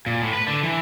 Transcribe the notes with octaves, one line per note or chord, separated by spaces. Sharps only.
A#2
A2
B4
D3
E3